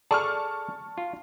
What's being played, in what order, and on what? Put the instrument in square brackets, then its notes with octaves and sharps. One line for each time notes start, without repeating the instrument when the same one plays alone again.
[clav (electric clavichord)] G#4 A4 D5 [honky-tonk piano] A5 C#6 F6
[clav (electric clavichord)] F4